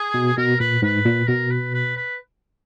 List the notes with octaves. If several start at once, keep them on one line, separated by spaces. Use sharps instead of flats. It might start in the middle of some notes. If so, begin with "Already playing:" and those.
Already playing: G#4
B2
B2 A#4
A#2 B4
G#2 B4
A#2
B2 A#4
B4
B4
B4